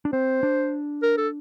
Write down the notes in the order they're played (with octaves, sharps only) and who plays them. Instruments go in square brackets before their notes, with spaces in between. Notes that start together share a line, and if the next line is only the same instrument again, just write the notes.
[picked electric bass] D4
[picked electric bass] C4 [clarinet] C5
[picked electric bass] D4
[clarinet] A#4
A4